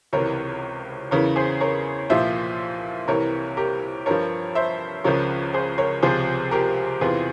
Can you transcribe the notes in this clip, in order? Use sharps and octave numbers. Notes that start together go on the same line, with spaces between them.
C#2 C3 E3 A#4 C#5
E2 C#3 E3 A#4 C#5
G#4 C5
A#4 C#5
C2 A#2 F3 C5 E5
C2 C3 E3 A#4 C#5
G4 A#4
G2 F3 A#4 C#5
C5 E5
C#2 C#3 F3 A#4 C#5
G#4 C5
A#4 C#5
C#2 C3 F3 G#4 C5
G4 A#4
E2 C3 E3 F4 G#4